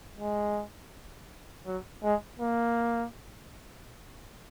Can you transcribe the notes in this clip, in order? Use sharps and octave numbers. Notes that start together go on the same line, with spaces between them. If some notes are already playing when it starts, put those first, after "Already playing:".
G#3
F#3
G#3
A#3